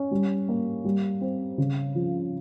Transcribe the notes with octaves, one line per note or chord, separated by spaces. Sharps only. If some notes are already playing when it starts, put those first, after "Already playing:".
Already playing: C#4
G3
A#3
G3
C4
C#3
F3